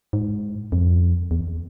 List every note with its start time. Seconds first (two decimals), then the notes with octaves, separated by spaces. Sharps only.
0.13 G#2
0.72 F2
1.31 E2